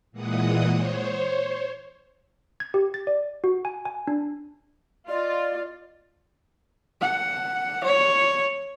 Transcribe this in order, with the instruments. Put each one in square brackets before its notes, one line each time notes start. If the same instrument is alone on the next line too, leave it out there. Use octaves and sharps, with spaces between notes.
[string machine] A#2 E3 G#3 F#5 D#6
C5 C#5
[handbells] G#6
G4
A6
D5
F#4
G#5
G#5
D4
[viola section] F4 [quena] D5 [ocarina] D#5
[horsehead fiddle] F#5
C#5